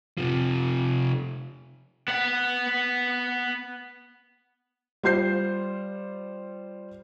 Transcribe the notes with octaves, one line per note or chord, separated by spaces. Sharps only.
C3 F3
B3 F#5
G3 F4 C5 G6 C7